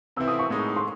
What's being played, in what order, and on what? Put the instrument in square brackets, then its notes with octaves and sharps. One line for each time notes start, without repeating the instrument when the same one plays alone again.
[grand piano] C3 E3 C4 E4 [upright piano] E6
[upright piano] D#6
C#6
[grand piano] A2 G#3 D#4
[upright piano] C6